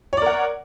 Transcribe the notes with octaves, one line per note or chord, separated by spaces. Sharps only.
A#4 C#5 D5 F#5